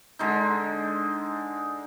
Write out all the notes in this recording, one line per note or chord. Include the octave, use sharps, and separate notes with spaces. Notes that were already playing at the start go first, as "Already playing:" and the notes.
D3 G#3 D#4